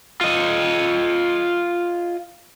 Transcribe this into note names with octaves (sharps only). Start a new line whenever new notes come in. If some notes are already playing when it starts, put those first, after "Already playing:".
F4 D#5